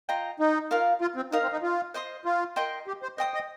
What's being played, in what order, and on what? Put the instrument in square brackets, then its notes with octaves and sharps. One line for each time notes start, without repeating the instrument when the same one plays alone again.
[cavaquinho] F4 D#5 G5 A#5
[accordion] D#4
[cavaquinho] F4 A#4 F5
[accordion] F4
C4
[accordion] D#4 [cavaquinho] A#4 F5 D#6
[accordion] C4
D#4
F4
[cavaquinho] C5 D#5 C6 D#6
[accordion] F4
[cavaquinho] A#4 D#5 G5 C6
[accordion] G4
C5
[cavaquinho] C5 G5 D#6 [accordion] D#5
[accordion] D#5